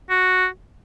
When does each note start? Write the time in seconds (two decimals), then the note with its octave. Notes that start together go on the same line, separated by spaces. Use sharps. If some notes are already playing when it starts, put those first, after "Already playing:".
0.10 F#4